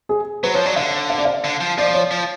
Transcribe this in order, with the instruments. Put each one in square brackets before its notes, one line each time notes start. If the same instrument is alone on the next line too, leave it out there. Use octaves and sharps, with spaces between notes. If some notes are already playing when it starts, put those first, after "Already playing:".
[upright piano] G#4
[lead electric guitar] F#3 [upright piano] B4
[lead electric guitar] F3 [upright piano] C#5
[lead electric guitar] F#3 [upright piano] D5
[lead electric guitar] D3 [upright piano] F5
[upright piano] F5
D5
F5
[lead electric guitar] D3
F3
[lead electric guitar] F3 [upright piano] D5
[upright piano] D5
C#5
[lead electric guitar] F3